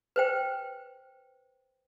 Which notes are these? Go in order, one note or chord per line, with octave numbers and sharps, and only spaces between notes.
B4 C5 G5